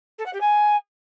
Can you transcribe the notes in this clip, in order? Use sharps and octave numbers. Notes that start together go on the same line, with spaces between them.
A4
F#5
G4
G#5